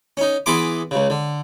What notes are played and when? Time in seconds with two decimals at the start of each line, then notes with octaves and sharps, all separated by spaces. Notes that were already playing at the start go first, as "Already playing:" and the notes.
0.17 C#4 D#4
0.46 E3 B3 G#4 B5 C6 D6
0.91 C#2 C#3
1.10 D3